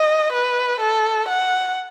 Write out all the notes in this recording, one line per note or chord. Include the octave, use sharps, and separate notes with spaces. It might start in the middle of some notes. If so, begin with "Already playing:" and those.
Already playing: D#5
B4
A4
F#5